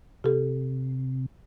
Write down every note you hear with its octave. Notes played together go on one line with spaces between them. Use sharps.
C3 G4 A4